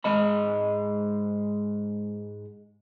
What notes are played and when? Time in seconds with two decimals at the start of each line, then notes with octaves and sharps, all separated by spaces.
0.04 G#2 G#3 D#5 B5